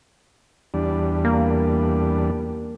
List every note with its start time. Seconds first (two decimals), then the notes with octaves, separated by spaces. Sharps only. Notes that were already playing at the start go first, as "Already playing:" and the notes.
0.74 E2 G3 D4
1.25 A#3